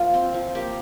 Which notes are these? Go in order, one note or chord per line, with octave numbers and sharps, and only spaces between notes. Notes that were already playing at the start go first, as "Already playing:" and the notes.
Already playing: F3 A#3 F4
C4
F3
A#3 G4